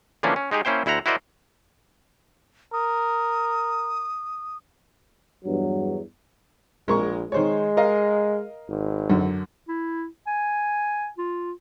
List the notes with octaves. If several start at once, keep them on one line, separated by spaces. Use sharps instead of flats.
D3 E3 F3 A#3 C#4 D4
C#4
G#3 D#4 G4 G#4
A#3 C#4 E4 C5 G5
D2 E4 C5 F#5 A#5
E4 F#4 A#4 C5 D5 D#5
A#4 D#6
E2 G2 F#3
A#1 G#3 A#4 C#6
D#3 G#3 C5 C#5
A#4 D#5 F5
G#1
F#2 D3
E4
G#5
F4